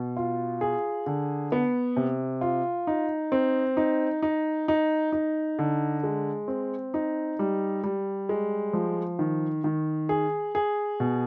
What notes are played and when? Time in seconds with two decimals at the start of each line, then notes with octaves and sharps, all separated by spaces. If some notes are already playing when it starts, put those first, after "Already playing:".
Already playing: B2
0.17 F4
0.61 G#4
1.06 D3
1.52 B3
1.97 C3
2.41 F4
2.87 D#4
3.32 C4
3.77 D#4
4.22 D#4
4.68 D#4
5.12 D#4
5.59 D3
6.03 G#3
6.48 C4
6.94 D#4
7.39 G3
7.84 G3
8.29 G#3
8.73 F3
9.19 D#3
9.64 D#3
10.09 G#4
10.55 G#4
11.00 B2